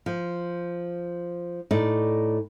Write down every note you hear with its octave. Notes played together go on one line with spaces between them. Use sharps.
F3
A2 D#4 D5